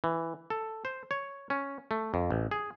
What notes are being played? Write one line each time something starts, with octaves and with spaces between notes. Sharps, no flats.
E3
A4
C5
C#5
C#4
A3
F2
A1
G#4